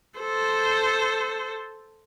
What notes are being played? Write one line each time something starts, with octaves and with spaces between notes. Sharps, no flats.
A4 C5